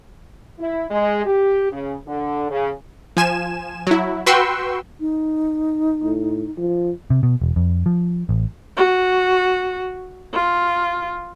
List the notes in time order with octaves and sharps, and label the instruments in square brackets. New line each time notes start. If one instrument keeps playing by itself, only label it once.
[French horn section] E4
G#3
G4
C#3
D3
C#3
[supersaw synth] F3 G#5 E7
F#3 E4
F#4 B4 G5 C6 C#6 E6
[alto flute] D#4
[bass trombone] A2
F3
[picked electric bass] C3
B2
E1
F2
F3
A1
[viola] F#4
F4